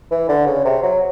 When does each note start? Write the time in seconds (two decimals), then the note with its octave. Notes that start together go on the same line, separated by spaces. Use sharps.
0.11 E3
0.29 D3
0.47 C#3
0.65 C3
0.83 F#3